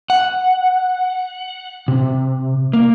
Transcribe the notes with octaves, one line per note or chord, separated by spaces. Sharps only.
F#5
C3
A#3